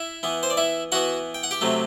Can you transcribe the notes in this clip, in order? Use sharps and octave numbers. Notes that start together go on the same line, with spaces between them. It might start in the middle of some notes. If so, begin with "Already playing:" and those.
Already playing: E4 E5
E3 B3
C5
D5
E4 E5
E3 B3 F#4 F#5
G5
F#5
G4 G5
C3 F#3 A3